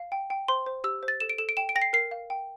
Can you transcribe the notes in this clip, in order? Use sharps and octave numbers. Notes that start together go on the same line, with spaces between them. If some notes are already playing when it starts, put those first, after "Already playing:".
Already playing: F5
G5
G5
C5 C6
C5
G4 E6
C5
A6
A4 E7
D7
A4 E7
D7
G5 E7
D7
G5 A#6
C7
A#4 C7
F5
G5